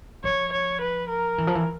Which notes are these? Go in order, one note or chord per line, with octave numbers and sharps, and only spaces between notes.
F3 C#5
C#5
B4
A#4
E3
F3
E3